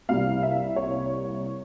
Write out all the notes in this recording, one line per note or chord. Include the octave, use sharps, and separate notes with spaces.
C2 C3 G3 A#3 F5
E5
C#5